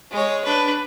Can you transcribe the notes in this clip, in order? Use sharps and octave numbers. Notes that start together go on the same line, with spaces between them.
G#3 C#5
D4 B4